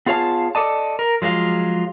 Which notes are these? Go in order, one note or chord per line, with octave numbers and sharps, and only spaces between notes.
B3 F4 G#4 C#5 F5 A5
A4 D5 D#5 A5
A#4
F3 F#3 G#3 F4